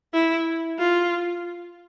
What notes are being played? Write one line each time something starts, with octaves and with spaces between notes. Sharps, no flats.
E4
F4